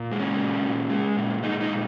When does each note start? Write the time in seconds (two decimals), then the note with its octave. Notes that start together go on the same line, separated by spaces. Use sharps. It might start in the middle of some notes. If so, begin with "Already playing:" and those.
Already playing: A#2
0.11 G#3
0.20 C#4
0.37 A#2
0.63 A#2
0.90 G#3
1.17 A#2
1.43 G#3 D#4
1.61 D#4
1.70 A#2